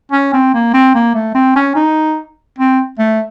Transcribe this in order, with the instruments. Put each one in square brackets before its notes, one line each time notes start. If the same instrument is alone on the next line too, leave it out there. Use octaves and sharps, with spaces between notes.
[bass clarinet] C#4
C4
A#3
C4
A#3
A3
C4
C#4
D#4
C4
A3